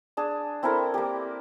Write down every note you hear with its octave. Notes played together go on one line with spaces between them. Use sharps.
D4 G#4 A5
C4 E4 A4 A#4
A#3 G4